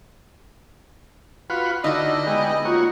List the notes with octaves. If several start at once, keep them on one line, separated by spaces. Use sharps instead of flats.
F4 F#4 B4
D3 D#4 E4 F#4 D#5
G#3 B3 G4
A#3 F4 F#4 C#5